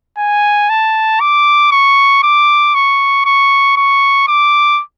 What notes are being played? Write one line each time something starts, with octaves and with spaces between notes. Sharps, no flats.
G#5
A5
D6
C#6
D6
C#6
C#6
C#6
D6